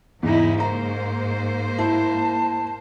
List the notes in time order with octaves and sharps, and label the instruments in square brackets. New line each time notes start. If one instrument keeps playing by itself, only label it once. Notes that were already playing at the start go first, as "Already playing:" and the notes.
[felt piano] E2 [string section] G#2 [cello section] C#3 D#4 E4
[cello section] A#3 C5 [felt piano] A#5
[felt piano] E4 [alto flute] A5